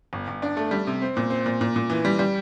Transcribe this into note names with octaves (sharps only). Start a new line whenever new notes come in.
G1
G1
D4
A3
G3
C3
C4
A#2
C4
A#2
A#2
A#2
E3
G3
G3